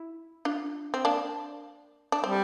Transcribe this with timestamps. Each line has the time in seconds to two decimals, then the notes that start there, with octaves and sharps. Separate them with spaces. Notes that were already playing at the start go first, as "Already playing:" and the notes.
Already playing: E4
0.45 D4 F4
0.94 C4
1.05 A#3 D4
2.12 D4
2.24 G3 C4